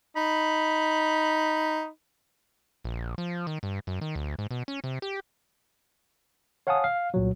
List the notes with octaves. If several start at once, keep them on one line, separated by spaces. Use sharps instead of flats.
D#4 B5
A#1
F3
D#3
G2
F#2
D#3
D2
G#2
B2
C#4
C3
G4
C#5 F5 F#5 G#5 A5 D#6
F5
C2 A#2 F#3